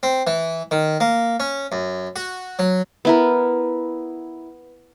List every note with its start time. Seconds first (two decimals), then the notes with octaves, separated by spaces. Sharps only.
0.03 C4
0.27 E3
0.71 D#3
1.00 A#3
1.40 C#4
1.72 F#2
2.16 F#4
2.59 F#3
3.05 B3 E4 A#4